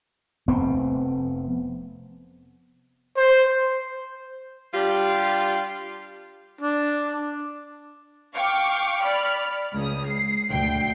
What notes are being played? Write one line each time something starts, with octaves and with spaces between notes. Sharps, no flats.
F1 B3 C4
C5
G3 D4 F4 G4
D4
F5 G5 C#6 D6
D5 B5 F6
C#2 D#6
C7
D2 G5 C7